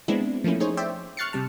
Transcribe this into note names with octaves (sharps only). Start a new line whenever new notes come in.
G#3 B3 C4 D4 E4
F3 A3 A#3 C#4 E4
D#4 G#4 C5 C#5
C5 D5 E5 G5
C#6 F6 F#6 A6 C7 C#7
C3 G3 A5